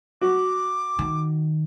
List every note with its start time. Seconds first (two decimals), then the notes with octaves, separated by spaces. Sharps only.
0.21 F#4 D6
0.99 D#3